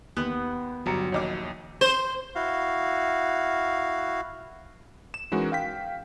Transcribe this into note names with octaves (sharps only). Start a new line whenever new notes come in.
D#2 B3 F#6
G1 F#3 G3 A#5 C#7
A#1 D#2 C#5 D#5 D6
C5
E4 F#4 F5
E7
E3 G#3 C#4 D#4 F#4 A#4
F5 G5 B6